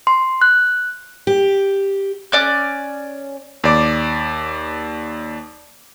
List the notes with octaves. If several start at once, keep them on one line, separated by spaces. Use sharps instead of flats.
C6
F#6
G4
C#4 D5 F#6
D#2 D5 D6